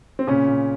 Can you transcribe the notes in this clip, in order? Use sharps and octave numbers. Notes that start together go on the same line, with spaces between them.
C4
A#2 C#3 C#4
A#2